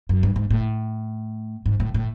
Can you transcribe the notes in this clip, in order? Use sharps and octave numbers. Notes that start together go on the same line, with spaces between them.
F#2
G2
G#2
A2
G#2
A2
A2